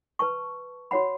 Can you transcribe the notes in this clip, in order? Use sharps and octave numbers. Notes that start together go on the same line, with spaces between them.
B4 A5 C#6
F#4 C#5 F#5 B5